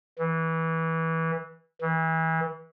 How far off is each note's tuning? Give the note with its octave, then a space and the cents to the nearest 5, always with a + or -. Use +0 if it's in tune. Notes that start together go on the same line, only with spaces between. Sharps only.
E3 -20
E3 -30